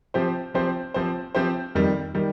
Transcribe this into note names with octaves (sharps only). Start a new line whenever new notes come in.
F3 C4 G4 C5
F3 C4 G4 C5
F3 C4 G4 C5
F3 C4 G4 C5
F2 D#3 G3
D#3 G3